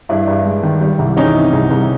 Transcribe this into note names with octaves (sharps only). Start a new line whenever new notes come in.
G2 D4 E4
G2
G#3
D#3
G3
C2
E3 C#4 D#4
C3
C2
C2